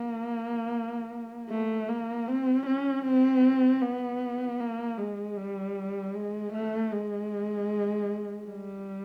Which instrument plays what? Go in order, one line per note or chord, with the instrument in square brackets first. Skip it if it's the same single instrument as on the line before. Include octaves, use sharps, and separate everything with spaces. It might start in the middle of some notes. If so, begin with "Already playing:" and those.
Already playing: [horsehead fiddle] A#3
A3
A#3
C4
C#4
C4
B3
A#3
G#3
G3
G#3
A3
G#3
G3